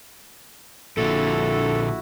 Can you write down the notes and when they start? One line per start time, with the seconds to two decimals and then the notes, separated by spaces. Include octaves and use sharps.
0.97 A#1 A#2 D3 E4 F#4 A4